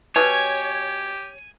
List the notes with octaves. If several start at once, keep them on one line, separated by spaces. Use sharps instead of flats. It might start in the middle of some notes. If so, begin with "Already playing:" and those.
B2 G4 C#5 G#5